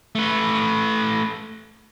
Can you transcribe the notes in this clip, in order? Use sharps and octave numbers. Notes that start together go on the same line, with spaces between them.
A3 B4